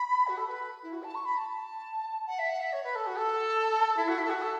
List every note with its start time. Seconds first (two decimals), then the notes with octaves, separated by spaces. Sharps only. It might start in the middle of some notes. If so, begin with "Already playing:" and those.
Already playing: B5
0.27 F#4
0.37 A4
0.47 B4
0.83 E4
0.92 F#4
1.03 A5
1.15 C#6
1.25 B5
1.37 A5
2.26 F#5
2.39 E5
2.49 F#5
2.60 E5
2.72 C#5
2.84 B4
2.95 A4
3.06 F#4
3.17 A4
3.97 E4
4.08 F#4
4.18 E4
4.25 A4
4.30 F#4
4.42 A4